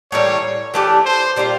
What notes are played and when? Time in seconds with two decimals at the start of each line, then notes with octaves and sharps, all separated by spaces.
0.12 A2 E3 G3 A#3 C#5
0.74 E3 A3 D4 G4
1.05 C5
1.36 A#2 G3 C4 F4